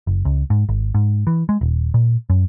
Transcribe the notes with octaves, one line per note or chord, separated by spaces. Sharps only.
F#1
C#2
G#2
G#1
G#2
E3
G#3
D#1
A#2
F#2